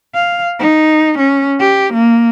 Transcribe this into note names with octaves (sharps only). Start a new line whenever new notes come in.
F5
D#4
C#4
G4
A#3